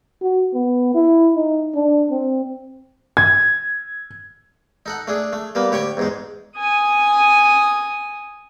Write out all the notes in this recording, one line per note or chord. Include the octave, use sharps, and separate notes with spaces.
F#4
B3
E4
D#4
D4
C4
G#6
D#4 A4 F#5
A3 D4 G#4
A3
G3 A#3 B3
D2 G4 C#5 G5 C#6
E2 G#2 G#3
G#5 D#6